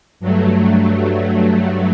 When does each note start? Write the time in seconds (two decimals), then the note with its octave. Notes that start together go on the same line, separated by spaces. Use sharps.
0.20 G2 F#3 A3